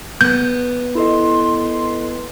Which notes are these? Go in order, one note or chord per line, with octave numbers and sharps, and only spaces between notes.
B3 G6
E4 A4 D#5 C6